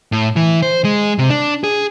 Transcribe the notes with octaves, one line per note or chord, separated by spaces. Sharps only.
A2
E3
C5
G#3
C3
D4
G#4